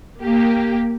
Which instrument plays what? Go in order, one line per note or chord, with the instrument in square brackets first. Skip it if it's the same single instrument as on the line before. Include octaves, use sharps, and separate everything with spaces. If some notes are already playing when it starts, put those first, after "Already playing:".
[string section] A#3 G4